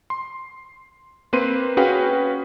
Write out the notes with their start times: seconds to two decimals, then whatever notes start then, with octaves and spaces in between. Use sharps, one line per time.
0.10 C6
1.33 A#3 C4 B4 C6 D#7
1.77 C#4 F#4 G#4 B4 F5 G5